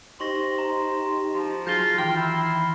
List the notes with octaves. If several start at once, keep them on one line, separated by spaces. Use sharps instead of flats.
D#4 G4 C5 C6 C#6 A#6
A#5
F3
F#3 F4 G#4 G6 A#6 G7
D#3 E3 G5 C6 F6
E4